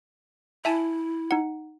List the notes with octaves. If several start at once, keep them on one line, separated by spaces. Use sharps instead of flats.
E4 E5 G#5 A5
D#4 F#5